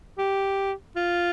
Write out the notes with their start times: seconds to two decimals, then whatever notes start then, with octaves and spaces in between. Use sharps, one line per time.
0.18 G4
0.96 F4